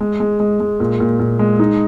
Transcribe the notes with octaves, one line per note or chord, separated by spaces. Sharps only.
G#3
G#3
G#3
G#3
A#2
A#2
A#2
G#3
D#4